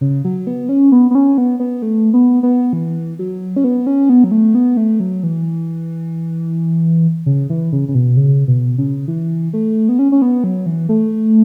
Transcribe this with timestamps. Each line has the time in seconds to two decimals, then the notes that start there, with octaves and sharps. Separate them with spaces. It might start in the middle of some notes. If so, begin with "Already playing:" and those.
0.01 C#3
0.25 F#3
0.47 B3
0.69 C#4
0.92 B3
1.11 B3
1.15 C#4
1.38 B3
1.60 B3
1.82 A3
2.14 B3
2.43 B3
2.73 E3
3.19 F#3
3.56 C#4
3.64 B3
3.87 C#4
4.09 B3
4.24 F#3
4.32 A3
4.55 B3
4.77 A3
5.00 F#3
5.23 E3
7.26 C#3
7.50 E3
7.73 C#3
7.88 C#3
7.95 B2
8.17 C#3
8.48 B2
8.78 C#3
9.08 E3
9.53 A3
9.89 B3
9.99 C#4
10.12 C#4
10.22 B3
10.44 F#3
10.66 E3
10.89 A3